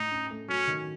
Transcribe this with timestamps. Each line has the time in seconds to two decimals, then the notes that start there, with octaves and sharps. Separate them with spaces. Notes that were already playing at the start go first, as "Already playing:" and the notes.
Already playing: A2 D#4
0.12 C#4
0.31 A3
0.49 F#3 C#4
0.67 D#3